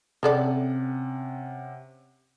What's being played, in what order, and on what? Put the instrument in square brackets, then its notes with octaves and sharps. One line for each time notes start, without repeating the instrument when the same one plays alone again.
[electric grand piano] C3 C#4 F#5 [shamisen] C4 A4 D5